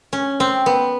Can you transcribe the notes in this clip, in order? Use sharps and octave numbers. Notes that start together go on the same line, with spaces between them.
C#4
C4
B3